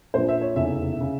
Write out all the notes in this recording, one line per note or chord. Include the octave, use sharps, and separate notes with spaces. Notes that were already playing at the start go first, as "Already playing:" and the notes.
A#1 A#2 F3 C5
E5
C#5
F1 E2 C#3 E5
C#3